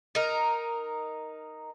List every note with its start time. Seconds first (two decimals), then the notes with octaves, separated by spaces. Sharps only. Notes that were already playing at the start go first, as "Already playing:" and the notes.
0.15 D#4 A#4